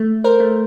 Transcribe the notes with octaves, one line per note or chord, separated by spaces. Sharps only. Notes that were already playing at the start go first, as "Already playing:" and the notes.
Already playing: A3
A#4 C5
A3